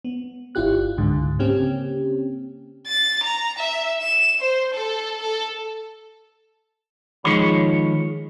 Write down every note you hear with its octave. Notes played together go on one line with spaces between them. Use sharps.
B3
G1 E4 F4 G4 F#6
C#2 G#2 D3
C#3 A#3 C4 C#4 G4
A6
A#5
E5
E7
C5
A4
A4
D#3 F3 G#3 C#5 B5